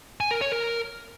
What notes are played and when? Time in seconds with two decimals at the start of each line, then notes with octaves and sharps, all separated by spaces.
0.20 G#5
0.31 A#4
0.41 C#5
0.52 A#4